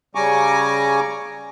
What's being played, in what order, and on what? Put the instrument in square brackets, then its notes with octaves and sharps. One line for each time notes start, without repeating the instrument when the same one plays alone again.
[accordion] C#3 G3 G#5 A#5 C#6 D6